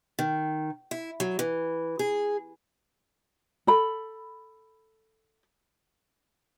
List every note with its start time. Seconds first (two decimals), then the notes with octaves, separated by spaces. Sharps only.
0.19 D#3
0.91 E4
1.20 F#3
1.39 E3
1.99 G#4
3.67 A4 B5